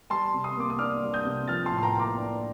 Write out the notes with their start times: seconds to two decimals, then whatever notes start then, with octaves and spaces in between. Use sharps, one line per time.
0.10 G3 A5 C6
0.34 C3
0.44 C6 D#6
0.57 A#3 D6
0.70 D#6
0.79 D4 D6 F6
1.03 G3
1.13 D#6 G6
1.25 C3
1.48 F3 F6 A6
1.66 A5 C6
1.71 A2
1.78 C6
1.83 G5 A#5
1.94 A#3
1.99 A#5 D6
2.18 D4